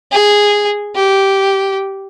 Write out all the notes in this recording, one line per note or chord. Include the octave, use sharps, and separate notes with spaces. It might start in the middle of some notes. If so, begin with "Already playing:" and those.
G#4
G4